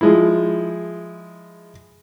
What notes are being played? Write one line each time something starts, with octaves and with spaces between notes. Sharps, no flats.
F3 G#3 E4